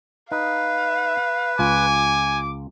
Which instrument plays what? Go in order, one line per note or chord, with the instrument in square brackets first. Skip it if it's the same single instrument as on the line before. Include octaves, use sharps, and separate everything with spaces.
[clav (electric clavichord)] D#4 [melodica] B4 [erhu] F5
[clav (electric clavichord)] C#2 F4 [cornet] G#5 [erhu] D6